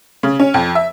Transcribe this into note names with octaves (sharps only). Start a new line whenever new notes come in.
C#3
C#4
F2
E5